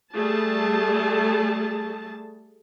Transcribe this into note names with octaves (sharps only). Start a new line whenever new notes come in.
G3 A3 G#4 A5